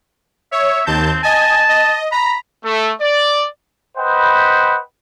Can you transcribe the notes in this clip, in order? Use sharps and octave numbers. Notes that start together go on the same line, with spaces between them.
C#5 E5
D#2 C4 A5 G6
D#5 G#5 A5
D#5
A#5 B5
A3
D5
B4 C5 D#5 F#5 G5 B5